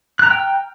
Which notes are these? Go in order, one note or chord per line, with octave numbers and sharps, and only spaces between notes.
G5 A#5 F6 F#6